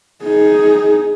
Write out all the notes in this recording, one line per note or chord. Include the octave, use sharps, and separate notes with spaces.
D#4 G#4